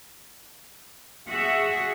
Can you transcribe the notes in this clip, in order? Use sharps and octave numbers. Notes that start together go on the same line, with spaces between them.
F#4 G#4 E5